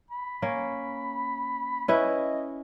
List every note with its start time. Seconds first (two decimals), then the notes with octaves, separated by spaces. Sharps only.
0.11 B5
0.42 A#3 C#4
1.88 C#4 E4 B4 D#5